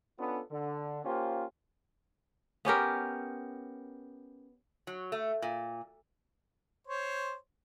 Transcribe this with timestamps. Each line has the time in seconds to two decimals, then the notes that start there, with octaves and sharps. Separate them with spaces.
0.18 B3 C#4 D4 F4 A4
0.50 D3
1.04 A#3 C#4 F4 G4 C5
2.65 B3 C#4 G4 A#4
4.87 F#3
5.12 A3
5.42 A#2
6.87 C5 C#5